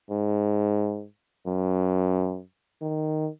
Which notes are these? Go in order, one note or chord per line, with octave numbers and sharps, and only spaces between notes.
G#2
F#2
D#3